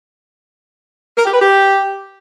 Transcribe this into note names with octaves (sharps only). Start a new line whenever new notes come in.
A#4
G4
B4
G4